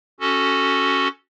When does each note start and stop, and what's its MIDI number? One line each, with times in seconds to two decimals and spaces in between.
0.20 1.08 61
0.20 1.08 66
0.20 1.08 69